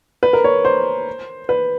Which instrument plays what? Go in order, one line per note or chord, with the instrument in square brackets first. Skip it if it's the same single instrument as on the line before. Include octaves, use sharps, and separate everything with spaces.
[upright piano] B4
A#4
C#5
C5
B4